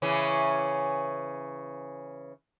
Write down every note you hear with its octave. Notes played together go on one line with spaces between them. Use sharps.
C#3 E3 C#4